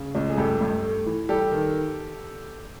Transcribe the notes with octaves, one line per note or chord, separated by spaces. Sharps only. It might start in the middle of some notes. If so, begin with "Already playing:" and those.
Already playing: C#3
C#2
G#4
G2 G4 A4
G2
A3
E3
G3 G4 A4
D#3